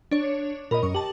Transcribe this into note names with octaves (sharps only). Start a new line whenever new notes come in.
D4 C#5
A#2 A#4 D#5 B5
F#2 C#6
G4 A5 F#7